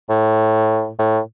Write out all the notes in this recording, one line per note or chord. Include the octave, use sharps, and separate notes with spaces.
A2
A2